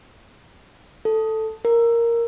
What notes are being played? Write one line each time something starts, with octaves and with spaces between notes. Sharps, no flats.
A4
A#4